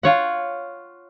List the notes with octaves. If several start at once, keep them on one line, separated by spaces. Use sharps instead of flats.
F4 C#5 F#5